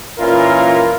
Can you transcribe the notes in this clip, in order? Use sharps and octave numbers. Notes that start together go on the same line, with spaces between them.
A#2 E3 C#4 E4 F4 A#4